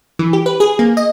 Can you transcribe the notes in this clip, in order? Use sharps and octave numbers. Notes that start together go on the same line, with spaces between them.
E3
G4
B4
G#4
A#3
D#5